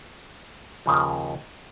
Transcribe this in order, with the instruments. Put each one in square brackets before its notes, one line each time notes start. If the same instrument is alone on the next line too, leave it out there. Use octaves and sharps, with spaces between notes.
[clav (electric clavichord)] D#2 C#3 F3